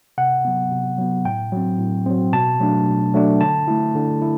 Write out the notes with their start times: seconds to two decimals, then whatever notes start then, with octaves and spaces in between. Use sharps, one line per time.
0.18 C3 F#5
0.45 F#3 B3
0.71 C3
0.98 F#3 B3
1.25 A2 G5
1.52 F#3 C4
1.79 A2
2.06 F#3 C4
2.33 B2 A5
2.60 F#3 A3 D4
2.87 B2
3.14 F#3 A3 D4
3.41 D3 A5
3.68 A3 E4
3.95 D3
4.22 E4